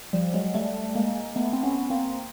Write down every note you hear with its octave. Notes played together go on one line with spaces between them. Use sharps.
F3 G3
F#3 G#3
G3 A3
G#3 A#3
A3 B3
C4
B3 C#4
A#3 C4